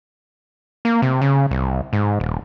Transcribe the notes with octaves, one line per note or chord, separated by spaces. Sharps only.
A#3
C3
C#3
C2
G#2
D#1